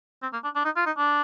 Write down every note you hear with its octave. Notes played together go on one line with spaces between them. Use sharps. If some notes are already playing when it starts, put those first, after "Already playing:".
C4
A#3
D4
D4
D#4
F4
D#4
D4